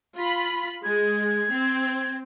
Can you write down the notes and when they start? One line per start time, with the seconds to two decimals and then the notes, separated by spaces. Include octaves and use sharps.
0.15 F4 B5
0.84 G#3 G#6
1.52 C4